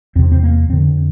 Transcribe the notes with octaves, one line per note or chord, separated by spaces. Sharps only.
E2 C3 C4
C4
A#3
F2 D3 C4